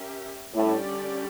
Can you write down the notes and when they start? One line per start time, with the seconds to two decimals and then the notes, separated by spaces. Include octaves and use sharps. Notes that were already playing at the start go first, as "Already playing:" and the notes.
Already playing: C#4 G4 A#4 E5
0.54 A2 D3 G3 C#4 G4 D5